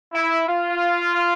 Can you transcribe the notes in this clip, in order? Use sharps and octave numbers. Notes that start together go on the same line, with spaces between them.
E4
F4